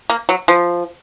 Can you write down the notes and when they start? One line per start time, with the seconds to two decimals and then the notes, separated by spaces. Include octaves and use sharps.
0.10 A#3
0.29 F#3
0.48 F3